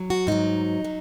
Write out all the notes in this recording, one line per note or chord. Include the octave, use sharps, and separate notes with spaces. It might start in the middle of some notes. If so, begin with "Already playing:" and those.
Already playing: F#3
F#4
G#2 F#3 D#4
F#3